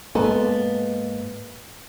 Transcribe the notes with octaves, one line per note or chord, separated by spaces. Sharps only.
G#2 G#3 A#3 B3 A4